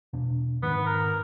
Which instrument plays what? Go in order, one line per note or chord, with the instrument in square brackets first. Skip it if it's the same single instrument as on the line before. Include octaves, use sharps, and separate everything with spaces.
[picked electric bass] E2 B2 D4
[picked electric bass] G#2 D#3 [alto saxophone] B3
[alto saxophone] A#4